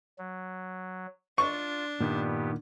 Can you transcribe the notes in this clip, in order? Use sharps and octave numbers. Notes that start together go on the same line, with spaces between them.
F#3
D4 F4 C#6
G2 A#2 D#3 B3 G4